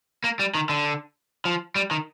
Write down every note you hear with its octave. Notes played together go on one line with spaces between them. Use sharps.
A#3
G3
D#3
D3
F3
G3
D#3